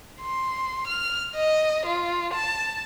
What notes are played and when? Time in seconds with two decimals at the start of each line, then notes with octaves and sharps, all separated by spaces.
0.21 C6
0.87 F6
1.36 D#5
1.86 F4
2.34 A5